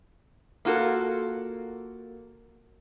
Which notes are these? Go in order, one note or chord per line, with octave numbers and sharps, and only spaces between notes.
A#3 F4 F#4 A4 A#4